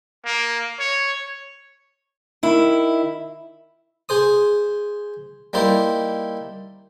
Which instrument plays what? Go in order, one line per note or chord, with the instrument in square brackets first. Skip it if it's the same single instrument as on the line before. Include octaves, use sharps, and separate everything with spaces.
[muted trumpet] A#3
C#5
[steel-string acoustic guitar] D#3 E4
[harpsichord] G#4 C5 D#6
G3 A#3 D#4 E4 C5